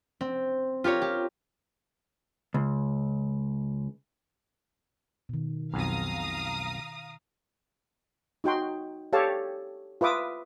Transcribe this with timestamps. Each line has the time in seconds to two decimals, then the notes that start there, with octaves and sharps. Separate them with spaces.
0.21 C4
0.84 F4 G4 A#4 C#5
1.02 G4
2.54 C#2
5.29 B2 D#3
5.74 B1 F2 F5 A#5 D#6
8.44 D#4 F#4 G5 C6
9.13 G4 A4 C#5 F5 A5
10.01 F4 B4 E5 D6 D#6